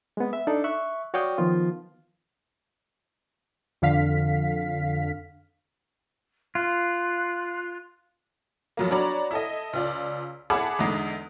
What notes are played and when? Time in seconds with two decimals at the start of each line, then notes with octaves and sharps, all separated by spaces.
0.17 G#3 B3
0.33 E5
0.47 D4 D#4 A4 D5
0.64 E5 C#6 F#6
1.14 F#4 C#5 D5 F5 G5 D#6
1.38 D#3 F3 B3 F4
3.82 F2 D3 F5 B6
6.55 F4 F#6
8.77 F2 F#3 A#3
8.91 D4 F#4 C#5 D5 A#5 B5
9.31 E4 A4 D#5
9.73 C#2 F4 D5
10.50 E4 G#4 F#5 A5 B5 D6
10.79 E2 D3 G#3 D#4